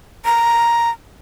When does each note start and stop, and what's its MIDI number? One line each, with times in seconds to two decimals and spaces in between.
0.25 0.90 82